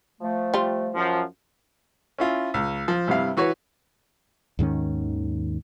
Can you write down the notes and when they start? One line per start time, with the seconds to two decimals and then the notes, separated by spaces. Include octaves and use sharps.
0.21 F3 A3
0.54 G3 F4
0.95 F#2 F3
2.18 C#4 E4 F4
2.54 C#2
2.88 F3
3.08 G2 C3 E4 F5
3.37 E3 F#4 B4 C#5
4.59 D#2 G#2 D#3 C#4